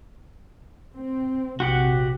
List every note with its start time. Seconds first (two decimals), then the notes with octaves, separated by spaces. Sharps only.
0.96 C4
1.60 A#1 C3 F#4 G4 F#5